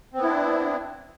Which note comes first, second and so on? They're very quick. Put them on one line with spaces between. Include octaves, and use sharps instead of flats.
C4 B3 E4 D4